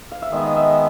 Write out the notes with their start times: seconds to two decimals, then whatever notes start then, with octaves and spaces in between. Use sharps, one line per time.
0.12 F5
0.22 E5
0.31 D#3 G#3 B3 D#5
0.56 E5